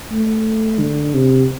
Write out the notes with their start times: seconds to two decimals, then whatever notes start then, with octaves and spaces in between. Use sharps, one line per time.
0.11 A3
0.79 D3
1.14 C3